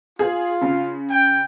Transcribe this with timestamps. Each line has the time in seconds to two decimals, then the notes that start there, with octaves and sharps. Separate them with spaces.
0.19 F4 G#4
0.61 C#3
1.09 G5